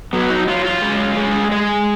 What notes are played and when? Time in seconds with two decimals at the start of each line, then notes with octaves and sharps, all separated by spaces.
0.13 F#3 B3
0.30 D#4
0.47 F#3 F4
0.65 F4
0.82 G#3
1.17 G#3
1.51 G#3 G#4